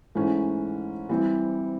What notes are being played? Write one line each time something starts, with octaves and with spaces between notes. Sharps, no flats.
G#2 E3 A3 C#4
E3 G3 C4